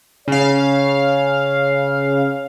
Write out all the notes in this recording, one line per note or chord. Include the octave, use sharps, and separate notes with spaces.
C#3 C#5 F5